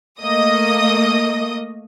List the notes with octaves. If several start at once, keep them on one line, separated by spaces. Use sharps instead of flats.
A3 A#3 D#5 D#6